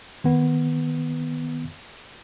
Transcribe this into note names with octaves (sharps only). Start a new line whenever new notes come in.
D#3 B3